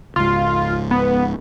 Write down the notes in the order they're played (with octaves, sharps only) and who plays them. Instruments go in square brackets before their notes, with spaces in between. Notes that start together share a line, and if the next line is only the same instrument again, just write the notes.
[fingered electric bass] C#2 G#2 [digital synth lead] F4
[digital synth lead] B3